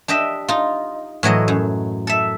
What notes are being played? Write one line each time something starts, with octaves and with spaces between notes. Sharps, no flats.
D4 G4 D#5 E5
D#4 F4
A2 E3 F#3 D#5
F#2
A4 E5